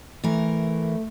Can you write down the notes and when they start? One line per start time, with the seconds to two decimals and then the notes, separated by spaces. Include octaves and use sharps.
0.24 E3 A3 A#4